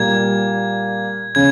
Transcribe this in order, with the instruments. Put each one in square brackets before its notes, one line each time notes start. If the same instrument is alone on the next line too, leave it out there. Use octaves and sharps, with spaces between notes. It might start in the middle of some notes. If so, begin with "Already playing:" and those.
Already playing: [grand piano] A#2 G3 A#3 [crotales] G#6
[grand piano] C#3 [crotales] G#6